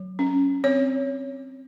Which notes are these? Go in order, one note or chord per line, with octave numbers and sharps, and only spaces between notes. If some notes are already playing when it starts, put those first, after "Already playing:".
Already playing: F#3
C#4
C4 C#5